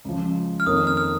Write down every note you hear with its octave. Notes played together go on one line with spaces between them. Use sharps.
C#2 C#3 F3
F6
F2 D#3 A#3 C#4 A#4 D#6
F6
F6
F6